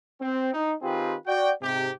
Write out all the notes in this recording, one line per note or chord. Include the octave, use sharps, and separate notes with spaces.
C4
D#4
D#3 C4 F4 G4 G#4 B4
F#4 D5 G5
G#2 C3 G4